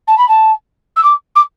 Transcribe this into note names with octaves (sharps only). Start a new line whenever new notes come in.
A5
B5
A5
E6
D6
D6